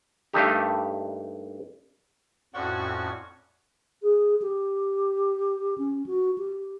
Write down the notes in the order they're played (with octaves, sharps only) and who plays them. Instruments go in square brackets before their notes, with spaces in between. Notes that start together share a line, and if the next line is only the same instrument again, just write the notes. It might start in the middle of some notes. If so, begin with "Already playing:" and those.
[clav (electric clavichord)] G2 A3 A#3 D4 D#4 G4
[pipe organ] F2 A2 C#4 [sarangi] F#4 [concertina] D5 F#5 C#6
[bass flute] G#4
G4
C#4
F#4
G4